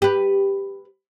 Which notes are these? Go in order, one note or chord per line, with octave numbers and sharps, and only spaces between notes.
G4 B4